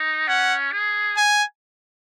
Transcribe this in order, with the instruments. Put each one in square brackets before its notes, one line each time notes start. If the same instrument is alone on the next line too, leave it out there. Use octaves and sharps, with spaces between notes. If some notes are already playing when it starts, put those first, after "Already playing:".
Already playing: [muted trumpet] D#4
[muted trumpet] C#4 [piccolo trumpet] F#5
[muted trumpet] G#4
[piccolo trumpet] G#5